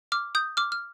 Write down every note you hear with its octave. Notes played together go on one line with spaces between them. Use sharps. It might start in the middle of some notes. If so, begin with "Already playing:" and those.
D6 F6
D#6 G6
D6 F6
F6